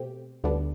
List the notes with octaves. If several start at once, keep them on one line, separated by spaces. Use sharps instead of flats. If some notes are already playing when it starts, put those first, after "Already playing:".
Already playing: B2 A3 C4 G4
D2 D3 G3 B3 D4